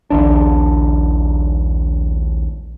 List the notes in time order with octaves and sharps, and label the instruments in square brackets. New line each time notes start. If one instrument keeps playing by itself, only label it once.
[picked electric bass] A#1 D#2 D4